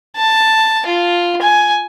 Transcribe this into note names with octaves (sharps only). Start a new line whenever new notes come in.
A5
F4
G#5